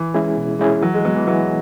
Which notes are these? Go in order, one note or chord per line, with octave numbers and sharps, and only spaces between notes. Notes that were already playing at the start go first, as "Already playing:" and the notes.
Already playing: E3
G#3 C#4 E4 G#4
B2
G#3 C#4 E4 G#4
E3 F#3
G#3
F#3 G#3 B3
E3
E3 F#3